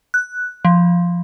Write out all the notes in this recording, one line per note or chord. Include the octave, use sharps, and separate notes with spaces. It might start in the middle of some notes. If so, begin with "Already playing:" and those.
F#6
F3